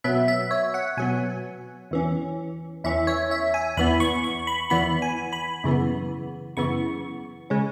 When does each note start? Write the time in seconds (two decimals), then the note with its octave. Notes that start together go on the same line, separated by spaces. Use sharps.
0.04 B2 F#3 B3 E5
0.28 E5
0.51 C#5
0.74 F#5
0.97 B2 F#3 B3 G#5
1.91 E2 E3 C#4
2.84 E2 E3 C#4 E5
3.07 C#5
3.31 E5
3.54 G#5
3.77 E2 E3 B3 B5
4.00 C#6
4.24 C#6
4.47 B5
4.70 E2 E3 B3 B5
5.02 G#5
5.33 B5
5.64 F#2 C#3 E3 B3
6.57 F#2 C#3 E3 B3 C#6
7.50 C#3 G#3 C#4